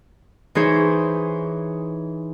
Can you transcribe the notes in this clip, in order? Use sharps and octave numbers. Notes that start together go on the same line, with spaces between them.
E3 D#4 G#4 C5 C#5